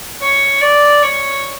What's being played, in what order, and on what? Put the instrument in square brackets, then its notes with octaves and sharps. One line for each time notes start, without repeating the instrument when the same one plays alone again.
[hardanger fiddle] C#5
D5
C#5